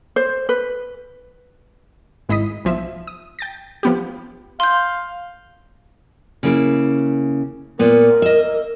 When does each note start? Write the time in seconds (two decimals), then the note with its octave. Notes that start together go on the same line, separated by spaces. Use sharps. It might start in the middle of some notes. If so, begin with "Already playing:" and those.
0.16 C5
0.49 B4
2.29 G#1 G#2 E4 D#5 D#6 B6
2.65 B1 F3 E5
3.07 D#6
3.39 G5 A6 A#6
3.83 F3 B3 G4
4.60 F5 C6 G6
6.43 C#3 A#3 E4
7.79 A#2 B3 A#4
8.22 D#5 E5